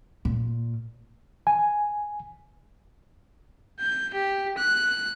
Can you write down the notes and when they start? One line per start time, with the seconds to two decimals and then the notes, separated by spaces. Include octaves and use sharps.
0.25 A#2
1.47 G#5
3.80 G6
4.14 G4
4.58 F#6